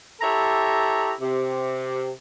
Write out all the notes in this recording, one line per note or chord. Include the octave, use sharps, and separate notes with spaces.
E4 G4 A4 C#5 A#5
C3